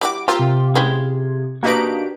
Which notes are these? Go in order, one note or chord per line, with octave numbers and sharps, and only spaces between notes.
G3 E4 F#4 D6
A#3 C4 F4 G4 A#4 E6
C3
C4 C#4 E4 G#4 C6
A#3 D4 D#4 F#4 G4 B4 D7